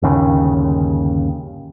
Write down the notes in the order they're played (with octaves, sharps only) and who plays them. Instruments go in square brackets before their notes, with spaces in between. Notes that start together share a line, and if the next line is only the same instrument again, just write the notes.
[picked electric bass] G1 D#2 C#3